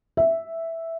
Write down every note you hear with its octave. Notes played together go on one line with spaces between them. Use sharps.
E5